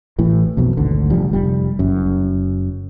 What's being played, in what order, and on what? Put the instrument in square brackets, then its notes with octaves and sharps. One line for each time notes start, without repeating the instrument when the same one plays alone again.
[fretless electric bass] A1 A2 E3
B1 F2 B2
G#1 D2 D3
F1 F3 G3
F1 G3
F#1 F#2